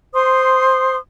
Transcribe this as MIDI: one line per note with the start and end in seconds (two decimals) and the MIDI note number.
0.13 0.97 72
0.13 0.97 84
0.13 0.97 87